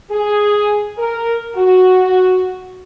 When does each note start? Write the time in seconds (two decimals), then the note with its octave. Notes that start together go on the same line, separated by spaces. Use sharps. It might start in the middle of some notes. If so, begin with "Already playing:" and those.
0.11 G#4
0.98 A#4
1.56 F#4